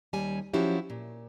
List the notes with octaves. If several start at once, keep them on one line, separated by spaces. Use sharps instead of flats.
D#2 G3 C#4 G#5
F3 F#3 C#4 E4 F#4 G4
A#2